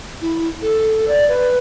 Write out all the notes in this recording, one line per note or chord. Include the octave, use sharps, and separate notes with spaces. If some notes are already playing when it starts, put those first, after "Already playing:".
E4
A4
D5
B4